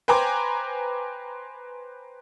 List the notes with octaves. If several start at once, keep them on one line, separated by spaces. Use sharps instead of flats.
B4 C5 G5 G#5 A#5 D6